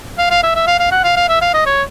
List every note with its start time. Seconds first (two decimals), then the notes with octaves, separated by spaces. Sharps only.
0.18 F5
0.30 F5
0.43 E5
0.55 E5
0.67 F5
0.79 F5
0.92 F#5
1.04 F5
1.16 F5
1.29 E5
1.41 F5
1.53 D#5
1.66 C#5